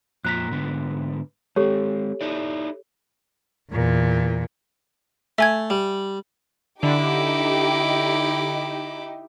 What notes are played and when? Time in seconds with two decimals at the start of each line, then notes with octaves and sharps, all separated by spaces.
0.25 F2 A#2 A#5 F#6 B6
0.50 G#2 D3 B3
1.56 G#3 C4 G4 A4 C#5
2.21 D#4 E4 D5
3.71 E2 A#2
5.38 A3 E5 G#5 G#6
5.70 G3
6.83 D3 D#4 E4 G4 D6